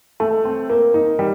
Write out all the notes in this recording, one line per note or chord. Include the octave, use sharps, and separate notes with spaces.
A3
C4
A#3
D#4
G3